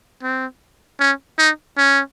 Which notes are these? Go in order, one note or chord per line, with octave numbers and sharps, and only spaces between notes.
C4
C#4
D#4
C#4